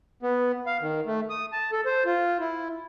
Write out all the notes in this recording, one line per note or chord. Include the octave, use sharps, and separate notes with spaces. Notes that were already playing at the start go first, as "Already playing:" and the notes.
B3
F5
D#3
A3
D#6
A5
A4
C5
F4
E4